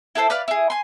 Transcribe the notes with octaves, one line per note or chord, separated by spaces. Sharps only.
E4 G#4 A4 C5
B4 D5 F5
E4 G#4
G#5 C6